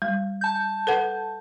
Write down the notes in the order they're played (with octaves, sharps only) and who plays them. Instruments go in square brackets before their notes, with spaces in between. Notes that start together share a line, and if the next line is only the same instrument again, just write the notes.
[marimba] G3
[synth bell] A5 G6
[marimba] A4 B4 F#5